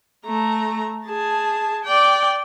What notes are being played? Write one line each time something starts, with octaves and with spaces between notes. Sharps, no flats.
A3 A#5
G#4 A5
D5 G5